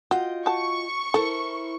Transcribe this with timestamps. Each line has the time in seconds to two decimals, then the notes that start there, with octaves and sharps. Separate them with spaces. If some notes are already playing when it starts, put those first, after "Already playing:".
0.11 F4 F#4 D#5 G5
0.46 F#4 A5 C#6
1.14 E4 A4 A#4 C5